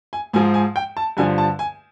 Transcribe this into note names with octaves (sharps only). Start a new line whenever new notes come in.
G#5
G#2 F3 G#5
G#5
G5
A5
G2 D3 F3 G#5
A5
G#5